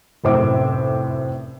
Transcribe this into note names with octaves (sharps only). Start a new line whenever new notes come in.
F1 F#2 A2 C5 E5 D6